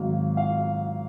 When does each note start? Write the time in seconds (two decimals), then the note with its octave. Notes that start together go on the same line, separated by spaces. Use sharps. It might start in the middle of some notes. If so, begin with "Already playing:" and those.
Already playing: G#1 G#2 F#3 F5
0.37 F5